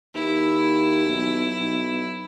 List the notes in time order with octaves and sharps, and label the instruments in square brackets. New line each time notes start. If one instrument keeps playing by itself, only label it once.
[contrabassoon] D#2 [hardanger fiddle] E4
[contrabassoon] B1
B1